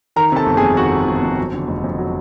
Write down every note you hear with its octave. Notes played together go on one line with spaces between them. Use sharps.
D#3 A#4 A#5
C3 A4 A5
G1
G#4 G#5
F2
D#3 F#4 F#5
C3
G1
F2
F#3
D3
F1
F2
F#3